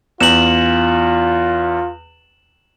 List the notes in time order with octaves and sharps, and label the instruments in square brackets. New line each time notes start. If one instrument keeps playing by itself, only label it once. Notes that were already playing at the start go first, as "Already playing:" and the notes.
[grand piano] E2 [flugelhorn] F4 [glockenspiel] E7 F#7